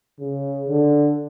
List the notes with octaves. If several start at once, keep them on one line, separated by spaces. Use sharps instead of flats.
C#3
D3